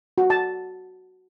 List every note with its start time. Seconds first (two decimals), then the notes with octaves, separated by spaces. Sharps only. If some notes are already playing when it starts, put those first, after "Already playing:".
0.18 F#4
0.30 A5